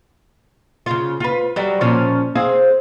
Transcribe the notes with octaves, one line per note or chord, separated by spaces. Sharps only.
C#3 F4
F4 B4
F#3 G3
A#2 F3 C#4
C4 G#4 F5